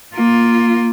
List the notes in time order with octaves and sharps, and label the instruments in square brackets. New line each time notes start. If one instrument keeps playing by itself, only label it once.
[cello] A#3 F4